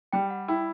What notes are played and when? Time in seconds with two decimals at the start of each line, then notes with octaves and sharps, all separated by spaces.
0.13 G3 G5
0.30 F#5
0.48 E4 G5